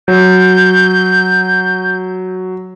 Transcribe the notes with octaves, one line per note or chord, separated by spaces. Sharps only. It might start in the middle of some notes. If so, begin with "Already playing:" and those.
F#3 G6